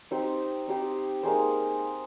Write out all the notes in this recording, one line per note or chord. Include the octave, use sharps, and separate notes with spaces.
C4 D#4 G4 C5
C4 D#4 G4 C5
A#3 D#4 G#4 C5